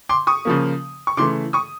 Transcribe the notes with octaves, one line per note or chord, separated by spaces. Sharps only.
C6 D6
C#6 D#6
C#3 F3 A#3
C#6
C#3 E3 A3 C6 D6
C#6 D#6